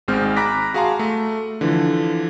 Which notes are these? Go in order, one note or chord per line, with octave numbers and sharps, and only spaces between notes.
G#1 G#2 G#3 C4 F6 G6
A#5 B5 D6 F#6 A#6 B6
F#4 G#4 F5 A5 A#5 C6
A3
D3 E3 F3